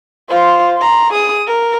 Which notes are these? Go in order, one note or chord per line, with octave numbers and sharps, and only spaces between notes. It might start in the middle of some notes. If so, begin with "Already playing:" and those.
F4 C5
A#5 C6
G#4 D#6
A#4